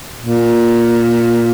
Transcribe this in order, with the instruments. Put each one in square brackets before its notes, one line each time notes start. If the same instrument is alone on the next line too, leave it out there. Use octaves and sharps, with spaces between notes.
[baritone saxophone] A#2